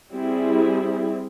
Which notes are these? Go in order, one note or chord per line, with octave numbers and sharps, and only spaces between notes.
G3 C4 E4 G#4